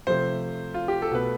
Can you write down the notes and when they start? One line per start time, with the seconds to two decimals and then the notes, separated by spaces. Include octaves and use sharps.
0.07 C3 F3 A3 C5
0.74 F4
0.88 G4
1.02 A4
1.11 B2 A3 B4